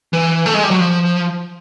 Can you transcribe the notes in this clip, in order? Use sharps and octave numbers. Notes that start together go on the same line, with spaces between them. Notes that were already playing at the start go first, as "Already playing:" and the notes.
E3
A3
G#3
G3
F#3
F3